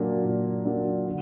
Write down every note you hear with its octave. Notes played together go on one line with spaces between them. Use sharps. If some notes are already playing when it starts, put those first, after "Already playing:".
Already playing: A#2 F#3 A#3 D4
A#2
F#3 A#3 D4
D3